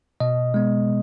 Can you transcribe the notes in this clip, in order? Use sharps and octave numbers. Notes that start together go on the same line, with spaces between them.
B2 D#5
G#3 B3